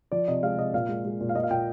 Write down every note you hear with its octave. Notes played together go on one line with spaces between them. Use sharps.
F3 D5
C3 D#5
G#3 F5
C3 D#5
A#2 F5
G#3
G#3
A#2
F5
A#2 D#5
F5
A#2 G5